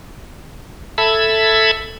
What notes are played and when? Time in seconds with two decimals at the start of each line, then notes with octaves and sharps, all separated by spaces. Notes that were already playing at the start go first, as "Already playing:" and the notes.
0.98 A4 E5 A5 B5 E6 G#6